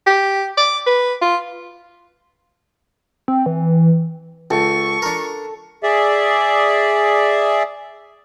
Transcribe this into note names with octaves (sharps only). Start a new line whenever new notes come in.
G4
D6
B4
F4
C4
E3
C#2 A4 C#6
D4 A#4
G#4 D5 E5